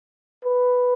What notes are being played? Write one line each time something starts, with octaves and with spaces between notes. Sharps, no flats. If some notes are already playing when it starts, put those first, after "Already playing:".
B4